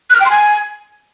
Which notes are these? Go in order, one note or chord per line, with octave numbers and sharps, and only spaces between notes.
F#6
F6
G5
C6
G#5